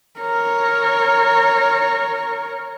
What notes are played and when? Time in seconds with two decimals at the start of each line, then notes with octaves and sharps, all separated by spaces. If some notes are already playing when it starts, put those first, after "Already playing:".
0.20 A#4 C#5